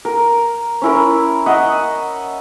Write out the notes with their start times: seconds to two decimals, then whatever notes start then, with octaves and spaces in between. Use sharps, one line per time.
0.05 A#4
0.82 C#4 E4 A#4
1.46 D#5 E5 F#5